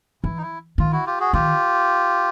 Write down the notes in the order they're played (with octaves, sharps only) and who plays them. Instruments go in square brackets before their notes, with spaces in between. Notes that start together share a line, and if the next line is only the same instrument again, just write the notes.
[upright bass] E3 [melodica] E4
[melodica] D#4
E4
[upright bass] D#3 [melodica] F4
[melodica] E4 F#4
F4 G4
F#4 G#4
[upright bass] D#3 [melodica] F4 G4